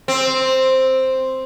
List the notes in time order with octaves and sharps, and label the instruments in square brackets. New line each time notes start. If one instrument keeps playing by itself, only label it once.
[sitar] C4